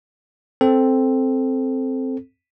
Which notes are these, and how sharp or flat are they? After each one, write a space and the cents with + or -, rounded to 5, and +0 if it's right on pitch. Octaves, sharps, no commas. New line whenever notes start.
C4 +0 A4 +0